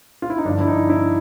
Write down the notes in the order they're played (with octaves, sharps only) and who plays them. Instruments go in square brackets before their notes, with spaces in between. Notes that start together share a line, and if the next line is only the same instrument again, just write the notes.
[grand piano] F4
E4
D#4
G2 D3 F3 D4
E4
D#4
E4